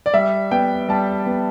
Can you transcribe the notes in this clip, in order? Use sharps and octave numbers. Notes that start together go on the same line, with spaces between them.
D5
G3 E5
B3 G5
G3 A5
B3